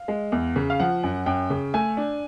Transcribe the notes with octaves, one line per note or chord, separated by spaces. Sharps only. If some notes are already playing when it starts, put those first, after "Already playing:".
Already playing: F5
G#3
E2
C#3
F5
F3 F#5
F#2
F#2 G5
C#3
A3 G#5
D4